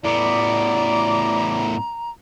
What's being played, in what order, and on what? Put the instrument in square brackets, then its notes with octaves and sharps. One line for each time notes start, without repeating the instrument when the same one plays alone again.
[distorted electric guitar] A2 B3 [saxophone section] D5 [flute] A#5